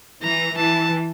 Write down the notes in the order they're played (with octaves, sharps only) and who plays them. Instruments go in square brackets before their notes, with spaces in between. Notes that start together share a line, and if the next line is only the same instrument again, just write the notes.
[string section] E3 [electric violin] A#5
[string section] E3 [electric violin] A5